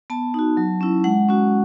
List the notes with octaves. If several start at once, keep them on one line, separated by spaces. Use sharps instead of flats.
B3 A5
D#4 F#4
F#3
C#4 E4
G#3 F#5
C#4 F#4